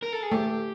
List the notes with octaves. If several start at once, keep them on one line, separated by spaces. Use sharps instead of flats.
A#4
A4
G#4
A3 G4